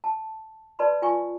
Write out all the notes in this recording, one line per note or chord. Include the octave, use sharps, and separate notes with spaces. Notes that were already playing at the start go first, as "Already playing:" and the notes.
A5
B4 D5 A5 B5 C6
F4 G#5 C#6